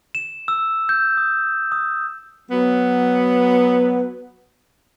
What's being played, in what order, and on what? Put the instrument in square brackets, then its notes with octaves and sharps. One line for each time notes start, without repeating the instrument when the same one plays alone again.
[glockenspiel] E7
E6
G6
D#6
D#6
[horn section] F#3 B3